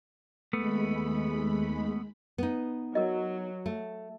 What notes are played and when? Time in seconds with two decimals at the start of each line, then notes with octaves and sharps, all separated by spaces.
0.53 D#2 G#3 A3 B3 B5
2.38 B3 D#4
2.95 F#3 A#4 D#5
3.66 A3